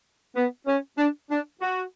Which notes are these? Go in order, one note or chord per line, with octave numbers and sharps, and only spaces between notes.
B3
C#4
D4
D4
F#4